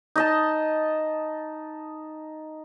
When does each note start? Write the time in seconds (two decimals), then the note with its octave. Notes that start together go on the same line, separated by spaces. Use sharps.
0.16 D#4 D#5 A5